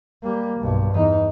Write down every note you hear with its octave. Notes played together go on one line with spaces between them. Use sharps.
G3 A#3
B1 G2
E2 D#4